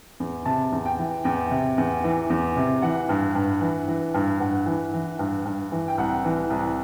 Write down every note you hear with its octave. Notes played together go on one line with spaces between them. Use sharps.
E2
C3 A5
E2
G5
E3
E2 G5
C3
E2
E3
E2
C3
E3 F#5
G2
G2
E3
E3
G2
G2 F#5
E3
E3
G2
G2
E3
G5
C2 F#5
E3
C2